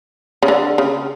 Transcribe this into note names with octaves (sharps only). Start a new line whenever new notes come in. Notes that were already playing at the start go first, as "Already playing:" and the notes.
C#3
D3
C#3